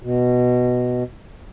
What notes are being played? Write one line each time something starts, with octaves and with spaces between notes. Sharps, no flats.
B2